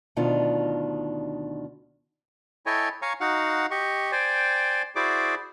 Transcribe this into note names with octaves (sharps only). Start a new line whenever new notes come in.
D2 B2 D#3 D4 F4
E4 A4 C#5 D#5 G5 G#5
C#5 F5 G#5 A#5 C#6
D#4 F#4 F5 F#5
G4 D#5 C#6
C5 D5 G5 G#5
E4 F#4 G#4 C5 D5 D6